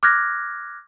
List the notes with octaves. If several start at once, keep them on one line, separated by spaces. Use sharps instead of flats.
D6 F6 F#6 G#6 A#6